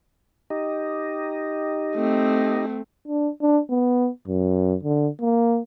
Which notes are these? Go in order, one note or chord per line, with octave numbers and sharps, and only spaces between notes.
D#4 G4 D#5
A3 C4
D4
D4
B3
F#2
D3
A#3